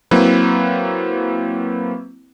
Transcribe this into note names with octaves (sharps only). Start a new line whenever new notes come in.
F#3 A#3 C4 E4 B4